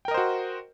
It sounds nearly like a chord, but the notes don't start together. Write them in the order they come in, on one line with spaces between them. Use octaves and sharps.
G5 A#4 D#5 C5 F#4